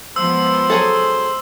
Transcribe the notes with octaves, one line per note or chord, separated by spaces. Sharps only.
F3 G#3 B3 C5 E6
F#3 G#4 A4